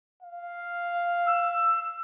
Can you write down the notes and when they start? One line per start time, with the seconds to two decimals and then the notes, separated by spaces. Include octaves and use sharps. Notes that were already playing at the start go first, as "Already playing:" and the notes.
0.23 F5
1.26 E6